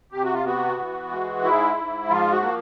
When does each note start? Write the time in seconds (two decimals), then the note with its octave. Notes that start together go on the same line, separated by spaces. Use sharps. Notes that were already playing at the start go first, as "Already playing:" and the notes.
0.12 C3 G4
0.23 F#4
0.34 F4
0.45 B3 F#4
0.79 E3
1.11 G#3
1.43 G#2 E4
1.77 G#2
2.09 F3 F4
2.32 F#4
2.42 A#3